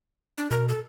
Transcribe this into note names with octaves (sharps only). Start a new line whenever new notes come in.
D4
B2 A#4
A4